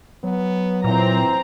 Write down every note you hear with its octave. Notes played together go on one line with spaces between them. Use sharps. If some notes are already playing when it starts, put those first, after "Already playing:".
F#3 B3
A#2 E3 C4 A#5